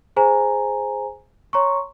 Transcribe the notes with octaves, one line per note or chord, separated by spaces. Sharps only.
G#4 C5 G#5 A#5
C#5 A#5 C6 C#6